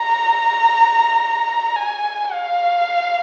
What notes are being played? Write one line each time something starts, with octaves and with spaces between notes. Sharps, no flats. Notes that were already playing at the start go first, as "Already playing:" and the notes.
Already playing: A#5
G#5
F5